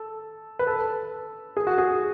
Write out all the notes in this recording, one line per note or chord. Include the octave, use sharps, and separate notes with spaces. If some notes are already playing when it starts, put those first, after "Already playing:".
Already playing: A4
B4
A4
G#4
F#4
G#4